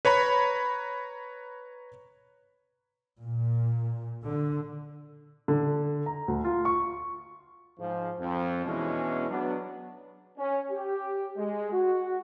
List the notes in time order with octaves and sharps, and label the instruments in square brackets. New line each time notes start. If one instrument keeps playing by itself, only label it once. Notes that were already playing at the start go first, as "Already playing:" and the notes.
[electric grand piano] B4 C#5 A#5 B5
[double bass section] A#2
D3
[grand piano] D3
A#5
D2
F4
C#6
[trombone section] G#2 F3
F2
E2 B2 E3 G#3 C#4 D4
F#3 B3 D4
[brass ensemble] C#4
G4
G#3
F#4